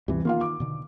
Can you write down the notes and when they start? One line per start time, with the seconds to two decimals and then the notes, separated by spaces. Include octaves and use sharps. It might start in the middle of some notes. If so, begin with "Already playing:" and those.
0.08 D2 G2 C3 E3
0.25 D#3 A#3 F4 F5
0.41 D6
0.60 B2 D3 D#3